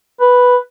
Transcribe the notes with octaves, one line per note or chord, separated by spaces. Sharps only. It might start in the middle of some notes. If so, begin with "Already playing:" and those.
B4